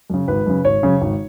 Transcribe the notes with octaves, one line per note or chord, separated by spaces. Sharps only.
F#2 C#3
G#1 B4
F#2 C#3
G#1 C#5
F#2 C#3
G#1